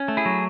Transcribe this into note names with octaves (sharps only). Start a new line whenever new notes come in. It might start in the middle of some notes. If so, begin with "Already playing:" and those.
Already playing: C#4
A3
E4 G#4
F#3